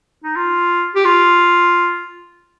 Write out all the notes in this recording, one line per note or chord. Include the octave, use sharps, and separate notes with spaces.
D#4
F4
G4
F4